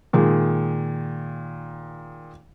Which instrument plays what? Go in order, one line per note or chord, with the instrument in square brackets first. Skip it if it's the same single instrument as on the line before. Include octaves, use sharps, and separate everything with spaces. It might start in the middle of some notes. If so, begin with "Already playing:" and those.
[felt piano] A#2 D#3 G#3